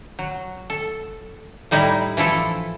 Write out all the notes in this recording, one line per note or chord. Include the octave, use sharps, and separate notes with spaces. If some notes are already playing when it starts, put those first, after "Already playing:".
F#3
A4
A2 G3 D#4 E4
E3 F3 E4 A4